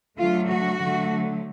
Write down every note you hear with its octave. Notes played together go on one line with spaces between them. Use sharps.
D3 F#3 A3 F4
F#4
D3 F#3 A3